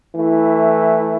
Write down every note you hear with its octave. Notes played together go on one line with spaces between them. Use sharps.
E3 A3 E4